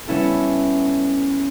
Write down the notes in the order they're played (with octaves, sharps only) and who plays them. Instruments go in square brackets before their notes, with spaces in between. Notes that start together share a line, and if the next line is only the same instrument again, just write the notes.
[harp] G3 B3 C#4 E4 A4